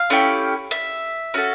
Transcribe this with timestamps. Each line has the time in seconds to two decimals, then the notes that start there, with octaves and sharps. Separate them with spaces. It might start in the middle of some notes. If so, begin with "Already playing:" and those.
Already playing: F5
0.10 A3 C#4 E4 G4
0.71 E5
1.34 C#4 F#4 A4